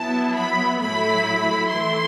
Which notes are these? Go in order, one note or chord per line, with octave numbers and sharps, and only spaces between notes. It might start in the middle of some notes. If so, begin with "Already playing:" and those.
Already playing: F#3 B3 E4 A5
B5
A2 F#3 A3 E4 B5
E3 A3 E4 C6